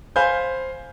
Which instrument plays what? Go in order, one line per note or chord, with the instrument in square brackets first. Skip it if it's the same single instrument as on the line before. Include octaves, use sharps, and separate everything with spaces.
[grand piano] C5 F5 G#5 B5 G6